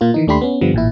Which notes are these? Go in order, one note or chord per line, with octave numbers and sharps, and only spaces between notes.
A#2 A#3 F4
D#3 E3 D#4
D#2 A3 D4 G4 B5 C6
B3 C#4
G2 D3 F3 G3 B3
A1 A#2 E4